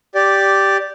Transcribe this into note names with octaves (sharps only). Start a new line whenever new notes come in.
G4 D5